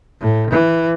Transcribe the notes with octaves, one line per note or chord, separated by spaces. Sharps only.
A2
E3